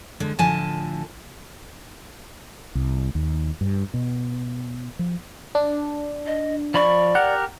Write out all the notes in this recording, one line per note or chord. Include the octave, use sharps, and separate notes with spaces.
D3 G#3
A2 D3 F3 G#5 A5
C2
D#2
G2
B2
F3
D4
D#5
F3 D5 B5 C#6
G4 A#4 F#5